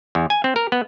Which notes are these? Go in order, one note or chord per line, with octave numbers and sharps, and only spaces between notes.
E2
G#5
C4
A#4
B3